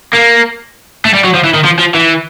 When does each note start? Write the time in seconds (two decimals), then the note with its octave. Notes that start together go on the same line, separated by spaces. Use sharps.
0.14 A#3
1.05 A3
1.14 G3
1.24 F#3
1.35 F3
1.44 E3
1.54 D#3
1.65 F3
1.79 F3
1.94 E3